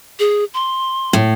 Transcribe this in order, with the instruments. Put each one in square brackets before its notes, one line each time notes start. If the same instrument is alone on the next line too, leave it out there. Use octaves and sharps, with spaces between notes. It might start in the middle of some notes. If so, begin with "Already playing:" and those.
[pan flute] G#4
C6
[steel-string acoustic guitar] A2